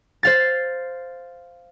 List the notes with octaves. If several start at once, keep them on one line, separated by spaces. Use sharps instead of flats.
C5 F5 A6